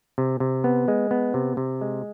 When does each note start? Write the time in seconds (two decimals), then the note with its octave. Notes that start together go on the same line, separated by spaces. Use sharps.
0.18 C3
0.40 C3
0.64 B3
0.88 G#3
1.11 B3
1.34 C3
1.57 C3
1.81 G#3